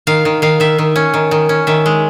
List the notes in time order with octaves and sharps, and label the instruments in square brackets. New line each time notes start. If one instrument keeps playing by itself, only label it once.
[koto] D#3 F5
D#3
D#3 F5
D#3 E5
D#3
C#4
D#3
D#3
C#4
D#3 E5
G#3